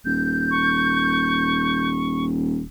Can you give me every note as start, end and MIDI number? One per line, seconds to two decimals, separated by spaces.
0.05 2.65 27
0.05 1.88 91
0.51 2.25 85